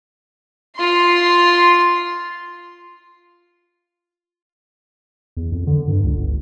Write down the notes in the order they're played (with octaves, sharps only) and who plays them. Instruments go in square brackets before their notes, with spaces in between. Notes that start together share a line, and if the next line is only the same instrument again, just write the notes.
[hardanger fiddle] F4 C6
[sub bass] E2
F2
D3
G2
C#2
G1